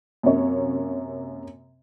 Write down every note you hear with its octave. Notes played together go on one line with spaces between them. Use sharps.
F#2 C3 A#3 C#5